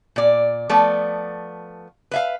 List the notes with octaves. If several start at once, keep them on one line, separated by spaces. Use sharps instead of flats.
A#2 D5
F3 A3 B3 D5
B4 E5 F5